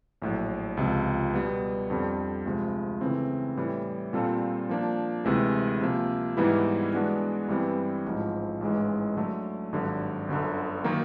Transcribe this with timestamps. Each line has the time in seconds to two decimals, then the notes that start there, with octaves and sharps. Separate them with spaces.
0.22 A#1 A2 F#3
0.77 C#2 C3 F3
1.33 B2 G3 B3
1.90 F2 D3 G3
2.45 D2 C3 F3 G#3
3.01 C#3 E3 A3 C4
3.57 A2 E3 G3
4.13 A#2 G3 C4 F4 A4
4.69 F3 A#3 D4
5.25 D2 C3 E3 G#3
5.81 C3 F3 A#3
6.37 G#2 E3 G3 B3 E4
6.93 E3 G#3 B3 D4 F#4
7.48 G2 E3 G3 C4
8.05 A1 G#2 F3
8.61 A1 G#2 E3 G#3
9.16 D3 F#3 A3
9.72 G#1 G2 D3 F#3
10.28 G1 F#2 D3
10.84 D#3 F#3 A#3 D#4